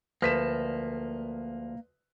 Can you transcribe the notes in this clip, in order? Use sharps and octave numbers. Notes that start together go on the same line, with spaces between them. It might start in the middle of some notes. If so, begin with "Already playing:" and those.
D2 F3 A#3 B4 B6 E7